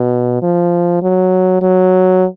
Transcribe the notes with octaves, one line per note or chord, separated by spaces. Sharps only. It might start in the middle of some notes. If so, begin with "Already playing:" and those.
Already playing: B2
F3
F#3
F#3